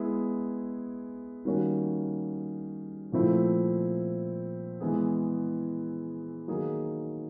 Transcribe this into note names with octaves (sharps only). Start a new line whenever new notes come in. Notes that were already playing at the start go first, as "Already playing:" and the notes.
Already playing: G#3 B3 E4 G#4
D#3 G3 A#3 C#4 F#4
A#2 F3 A3 C4 E4
E3 G#3 B3 E4 G#4
D#3 F#3 A#3 D#4 G#4